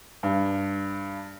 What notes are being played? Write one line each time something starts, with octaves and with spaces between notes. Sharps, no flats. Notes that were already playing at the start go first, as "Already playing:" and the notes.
G2